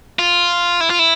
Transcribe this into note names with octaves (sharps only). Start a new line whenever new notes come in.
F4
E4
F4
E4